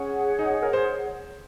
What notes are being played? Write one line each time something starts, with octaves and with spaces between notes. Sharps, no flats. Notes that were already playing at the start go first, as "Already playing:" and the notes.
Already playing: C#4 G#4 C#5 F#5
D#4
D#4
A#4
C5